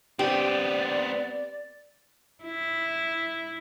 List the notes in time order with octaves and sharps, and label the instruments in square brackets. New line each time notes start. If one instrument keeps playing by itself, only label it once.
[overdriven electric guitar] B3 C4 [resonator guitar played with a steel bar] G4 [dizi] D5
[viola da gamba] E4